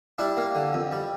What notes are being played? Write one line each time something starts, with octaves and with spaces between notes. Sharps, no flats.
G3 D4 E4
A#3
D3
F2
G3